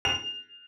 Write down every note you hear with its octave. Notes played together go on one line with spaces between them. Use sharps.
F7